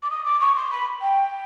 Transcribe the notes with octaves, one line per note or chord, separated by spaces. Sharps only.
D6
D#6
D6
C#6
C6
B5
G5